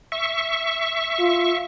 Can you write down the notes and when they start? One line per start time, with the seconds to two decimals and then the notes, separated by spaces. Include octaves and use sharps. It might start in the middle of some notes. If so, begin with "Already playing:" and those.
0.12 E5 C#6
1.20 F4